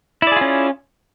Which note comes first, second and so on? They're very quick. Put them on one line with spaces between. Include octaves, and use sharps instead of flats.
E4 D5 G#4 F4 C#4